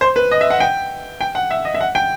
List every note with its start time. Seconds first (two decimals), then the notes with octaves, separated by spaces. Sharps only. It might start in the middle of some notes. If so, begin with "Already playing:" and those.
0.01 C5
0.16 B4
0.31 D#5
0.41 E5
0.50 F#5
0.60 G5
1.21 G5
1.35 F#5
1.51 E5
1.65 D#5
1.74 E5
1.80 F#5
1.95 G5